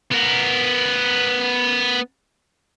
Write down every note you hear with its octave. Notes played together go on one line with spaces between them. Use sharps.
B3 A#4